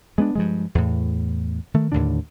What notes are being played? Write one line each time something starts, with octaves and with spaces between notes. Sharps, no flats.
G#3 B3 C4 D4
G2 F3 G#3
E2 A2
D#3 A3
D#2 A2 D3 D4